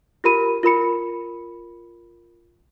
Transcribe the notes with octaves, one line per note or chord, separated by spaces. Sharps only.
F4 G4 A#4 B5 D#7
F4 A#4 B5 C#7